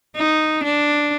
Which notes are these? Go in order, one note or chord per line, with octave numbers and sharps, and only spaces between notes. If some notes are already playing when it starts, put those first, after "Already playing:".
D#4
D4